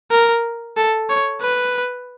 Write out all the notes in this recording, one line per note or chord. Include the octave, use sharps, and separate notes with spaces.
A#4
A4
C#5
B4